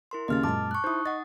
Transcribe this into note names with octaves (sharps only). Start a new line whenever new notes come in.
E4 A#4 C6
D#2 C#3 D#5 F6 A6
F#2 A#2 G#3 A5 D6
C#6 F#6
D#4 E4 C5 D#6
D#5 F#5 A6